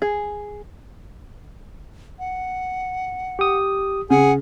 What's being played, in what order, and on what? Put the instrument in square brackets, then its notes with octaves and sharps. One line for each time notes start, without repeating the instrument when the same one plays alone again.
[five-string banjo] G#4
[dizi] F#5
[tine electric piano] G4 D#6
[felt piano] C#3 [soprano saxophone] G#4 [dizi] F#5